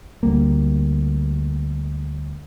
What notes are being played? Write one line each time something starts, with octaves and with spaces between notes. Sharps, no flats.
D2 G3 A#3